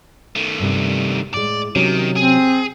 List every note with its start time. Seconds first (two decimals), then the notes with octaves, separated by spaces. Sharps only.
0.36 D#3 A3
0.59 G2 C3
1.34 A2 G#3 D5
1.75 C3 D#3 F#3 C#4
2.16 C4 G#4